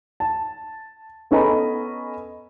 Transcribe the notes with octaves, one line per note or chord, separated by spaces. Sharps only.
A5
B3 C#4 A4 D#5 A#5 B5